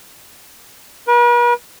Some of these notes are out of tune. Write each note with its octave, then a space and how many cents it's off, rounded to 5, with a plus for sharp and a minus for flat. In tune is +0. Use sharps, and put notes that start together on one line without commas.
B4 -45